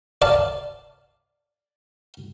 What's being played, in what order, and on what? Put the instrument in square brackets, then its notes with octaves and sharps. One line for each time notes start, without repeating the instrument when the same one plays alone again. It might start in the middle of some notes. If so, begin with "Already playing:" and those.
[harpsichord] D5 F5 A5